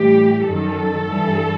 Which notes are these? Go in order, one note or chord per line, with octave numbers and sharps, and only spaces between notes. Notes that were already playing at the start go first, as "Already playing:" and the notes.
Already playing: A2 E3 G3 G4
F#2 D#3 F#3 A4
G2 E3 G3